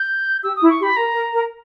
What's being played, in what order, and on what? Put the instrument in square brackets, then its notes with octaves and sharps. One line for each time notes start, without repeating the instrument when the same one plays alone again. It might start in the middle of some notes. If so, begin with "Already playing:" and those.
Already playing: [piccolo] G6
[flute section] G4 [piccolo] E6
[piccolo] D#6
[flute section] E4
[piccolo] C#6
[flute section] G4
[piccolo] B5
[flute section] A#4 [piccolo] A#5
[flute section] A#4
A#4